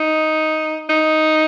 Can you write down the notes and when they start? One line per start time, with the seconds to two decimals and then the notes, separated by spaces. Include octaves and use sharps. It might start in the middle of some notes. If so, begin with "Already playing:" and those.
Already playing: D#4
0.89 D#4